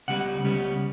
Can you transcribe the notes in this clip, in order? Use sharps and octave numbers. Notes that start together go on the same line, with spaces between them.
C#2 C#3 G3 B3 F#5
C#2 C#3 G3 B3